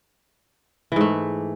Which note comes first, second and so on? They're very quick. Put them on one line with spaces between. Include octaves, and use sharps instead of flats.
E3 G#2 A3